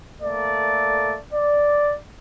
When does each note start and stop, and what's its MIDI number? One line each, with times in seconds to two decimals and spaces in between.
0.21 1.15 57
0.21 1.15 58
0.21 1.15 69
0.21 1.15 74
1.33 1.92 74